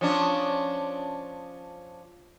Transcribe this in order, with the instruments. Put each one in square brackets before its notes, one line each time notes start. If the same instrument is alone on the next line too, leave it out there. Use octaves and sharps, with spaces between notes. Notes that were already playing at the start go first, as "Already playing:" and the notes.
[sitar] F3 C#4 D4